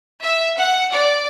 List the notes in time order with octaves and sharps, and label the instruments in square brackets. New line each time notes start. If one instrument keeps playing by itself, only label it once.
[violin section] E5
F#5
D5